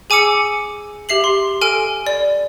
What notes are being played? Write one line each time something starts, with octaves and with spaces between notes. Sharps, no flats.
G#4 G#5 D6 E6 C#7
G4 E5 C7 F#7
C6
A4 G#5 F6 D7
D5